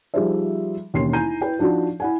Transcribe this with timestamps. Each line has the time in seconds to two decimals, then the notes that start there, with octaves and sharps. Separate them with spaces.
0.14 F3 G3 D#4 G#4 C5 E5
0.93 E1 D#2 C#4 C6 C7
1.13 D#4 E4 G#5 A#5 G6 D#7
1.41 E4 B4 G5
1.59 F3 D4 D#4 F#4
2.00 E4 F#5 G#5